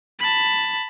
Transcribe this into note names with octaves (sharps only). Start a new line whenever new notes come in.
A5 B5